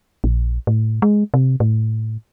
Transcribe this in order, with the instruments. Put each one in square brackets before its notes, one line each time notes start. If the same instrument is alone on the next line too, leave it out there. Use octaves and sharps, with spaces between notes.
[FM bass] A#1
A2
G#3
C3
A2